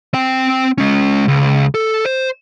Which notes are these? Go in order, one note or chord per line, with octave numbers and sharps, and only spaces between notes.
C4 G5
G#3 C#4
C#2
A4
C5